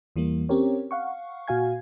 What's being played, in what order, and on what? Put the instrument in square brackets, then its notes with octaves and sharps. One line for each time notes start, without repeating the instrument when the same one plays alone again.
[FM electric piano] E2 E3 G3 A#3
C4 C#4 G4 A#4 C#5
F5 F#5 C#6
A#2 F#4 F5 G#5 G#6